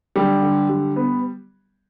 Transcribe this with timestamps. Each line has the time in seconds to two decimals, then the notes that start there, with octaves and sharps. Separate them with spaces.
0.16 D3 G3 G4
0.42 D3
0.70 G3
0.96 B3